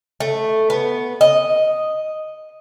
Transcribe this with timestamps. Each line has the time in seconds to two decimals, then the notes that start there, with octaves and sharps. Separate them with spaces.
0.20 A3
0.70 B3
1.21 D#5